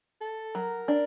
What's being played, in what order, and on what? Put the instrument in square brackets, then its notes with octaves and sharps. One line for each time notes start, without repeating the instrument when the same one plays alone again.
[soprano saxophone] A4
[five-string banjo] F#3 [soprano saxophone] A#4
[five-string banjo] D4